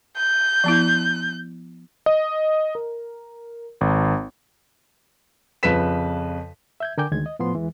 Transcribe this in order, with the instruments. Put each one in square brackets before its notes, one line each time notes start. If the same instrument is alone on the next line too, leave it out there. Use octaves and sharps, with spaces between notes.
[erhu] G6
[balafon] F3 B3 E4
[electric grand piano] D#5
A#4
G#1
[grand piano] F2 C#3 F3 B4 B6 E7
[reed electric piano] E5 G6 G#6
D3 A#4 G5 G#5 D6 G6
D2 D#3 G#3 G#6
D#5
A2 F3 B3 C6
E2 E3 G#3